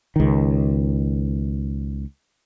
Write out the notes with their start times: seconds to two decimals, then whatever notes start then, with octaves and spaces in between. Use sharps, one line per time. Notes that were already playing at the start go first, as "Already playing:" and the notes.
0.16 C#2 D#3